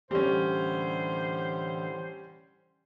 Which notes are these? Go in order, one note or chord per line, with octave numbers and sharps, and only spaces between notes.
A2 D3 E3 G3 C#4 C5